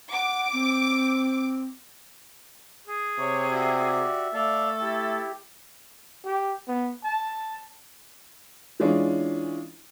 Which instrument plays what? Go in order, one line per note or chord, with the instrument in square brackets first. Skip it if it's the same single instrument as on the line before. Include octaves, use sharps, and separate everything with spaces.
[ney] F#5 [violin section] D6
[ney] C4
[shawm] G#4
[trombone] C3 [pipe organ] G4 C#5
[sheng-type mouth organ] F#4 G4 D5 [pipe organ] E5
[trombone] A3 [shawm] A4 [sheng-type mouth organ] D5 F5
[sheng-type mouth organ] E4 [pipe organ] G4
[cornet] G4
B3
A5
[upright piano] E3 G#3 C#4 D4 F4